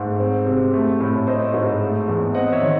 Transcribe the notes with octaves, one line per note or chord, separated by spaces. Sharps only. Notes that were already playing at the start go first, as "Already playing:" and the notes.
Already playing: G#2 A3
C4
C3
A3
A2
A3 C5 D#5
G#2
A3
E2
C4 D#5 F#5
C#5 E5
D#3